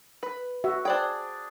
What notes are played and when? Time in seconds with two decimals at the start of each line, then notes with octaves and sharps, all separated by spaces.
0.23 B4
0.64 F#4 E5
0.85 D4 G#4 C5 D5 G5